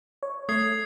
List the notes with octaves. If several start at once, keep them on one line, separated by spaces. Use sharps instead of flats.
C#5
A3 D#6 G#6 C7